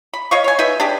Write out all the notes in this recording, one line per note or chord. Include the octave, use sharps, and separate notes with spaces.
B5
C#5 D#5 F5 C#6
C#5 G#5
D#4 B4 E5
D4 G4 G#4